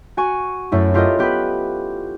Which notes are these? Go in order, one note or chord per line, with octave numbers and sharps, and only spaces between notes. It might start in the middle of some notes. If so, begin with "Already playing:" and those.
F#4 G#5 C#6
F#2 A3 E4
E4 F4 G4 A4 A#4 D#5
B3 G4 B4 B5